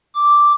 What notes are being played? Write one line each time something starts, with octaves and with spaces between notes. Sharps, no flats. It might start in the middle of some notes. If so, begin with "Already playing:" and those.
D6